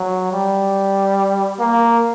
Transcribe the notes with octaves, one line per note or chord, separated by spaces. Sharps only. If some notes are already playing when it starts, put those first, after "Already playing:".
Already playing: F#3
G3
A#3